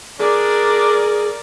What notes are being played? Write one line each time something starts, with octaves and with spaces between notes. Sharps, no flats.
D4 G#4 A#4 D5